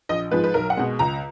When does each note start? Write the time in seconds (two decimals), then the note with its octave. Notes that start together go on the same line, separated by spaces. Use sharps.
0.09 A#1 D#5
0.31 G#2 F3 G#3 B4
0.44 B4
0.54 B1 A#4
0.70 F#5
0.77 B2 G#3
0.99 C#2 A#5